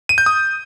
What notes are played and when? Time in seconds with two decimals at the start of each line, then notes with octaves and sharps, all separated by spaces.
0.09 D#7
0.18 G6
0.26 D#6